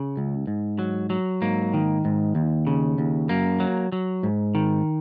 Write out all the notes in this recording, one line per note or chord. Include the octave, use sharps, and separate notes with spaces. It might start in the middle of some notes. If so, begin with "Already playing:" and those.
Already playing: C#3
C#2
G#2
F#3
F#3
G#2 A#3
D#3
G#2
D#2
C#3
D#2
F#2 A#3
F#3
F#3
G#2
D#3